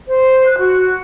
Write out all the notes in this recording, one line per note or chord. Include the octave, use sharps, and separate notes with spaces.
C5
F#6
F#4